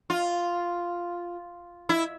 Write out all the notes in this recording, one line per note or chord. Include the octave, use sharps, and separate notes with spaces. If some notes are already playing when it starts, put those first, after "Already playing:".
F4
E4